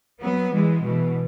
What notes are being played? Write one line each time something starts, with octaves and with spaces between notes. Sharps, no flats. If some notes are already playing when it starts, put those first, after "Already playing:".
F#3 B3
E3 G#3
B2 E3